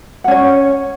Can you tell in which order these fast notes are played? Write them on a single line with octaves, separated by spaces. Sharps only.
F#5 C#4 C#5